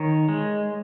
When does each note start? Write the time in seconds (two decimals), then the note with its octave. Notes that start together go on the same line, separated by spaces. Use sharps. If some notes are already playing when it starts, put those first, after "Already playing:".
Already playing: D#3 C#5
0.29 G#3